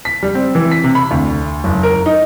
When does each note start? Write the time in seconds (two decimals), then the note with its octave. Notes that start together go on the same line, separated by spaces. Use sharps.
0.05 B6
0.23 G3
0.35 C4
0.55 E3
0.71 B6
0.84 C3
0.95 B5
1.11 D2
1.64 F#1
1.83 A#4
2.06 D#4